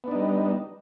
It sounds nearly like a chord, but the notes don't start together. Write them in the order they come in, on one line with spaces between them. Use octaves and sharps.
B3 D4 D#4 G3